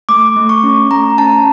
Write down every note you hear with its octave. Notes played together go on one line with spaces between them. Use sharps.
A3 D6
A3
C#6
C#4
A3 A#5
C#4 A5